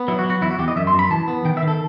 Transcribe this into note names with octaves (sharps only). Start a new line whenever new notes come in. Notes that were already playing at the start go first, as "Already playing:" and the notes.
Already playing: B3
F#3 E4
F#4
F#3
F#4
E2 E4
F#4
E2 G4
D#5
F#2 E5
C6
F#2
B5
E3 A5
B3
D#3 G5
E5
D#3
A4